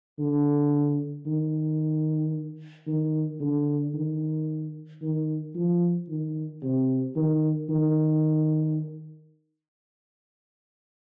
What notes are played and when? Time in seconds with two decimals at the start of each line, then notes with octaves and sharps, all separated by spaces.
0.19 D3
1.26 D#3
2.87 D#3
3.40 D3
3.94 D#3
5.02 D#3
5.55 F3
6.08 D#3
6.62 C3
7.16 D#3
7.69 D#3